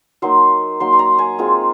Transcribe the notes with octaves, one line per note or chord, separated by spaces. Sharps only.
F#3 A#3 D#4 C6
F#3 A#3 D#4 C6
C6
A#5
G#5
G#3 C4 F4